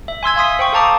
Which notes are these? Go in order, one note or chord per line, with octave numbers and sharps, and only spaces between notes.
E5
G#5 C6 E6 G#6
F5 C6 D#6 B6
C5 G5 C#6
A4 F5 A5 A#5 D6 D#6